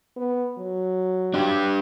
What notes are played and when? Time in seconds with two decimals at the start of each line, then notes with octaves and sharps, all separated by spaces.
0.16 B3
0.58 F#3
1.34 D4 G4